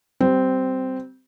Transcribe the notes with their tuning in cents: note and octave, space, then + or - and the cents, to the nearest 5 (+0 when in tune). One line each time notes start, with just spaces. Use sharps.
G3 -25 C4 -10